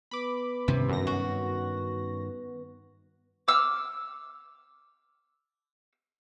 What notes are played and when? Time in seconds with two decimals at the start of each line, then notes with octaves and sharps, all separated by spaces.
0.11 B3 B4 B5 D6
0.68 G2 C3 D#3 C#4
0.89 F#2 A#6
1.07 F#4
3.48 D6 E6 F6